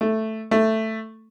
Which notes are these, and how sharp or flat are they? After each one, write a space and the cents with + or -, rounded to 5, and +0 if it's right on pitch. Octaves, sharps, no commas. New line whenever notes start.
A3 +0
A3 +5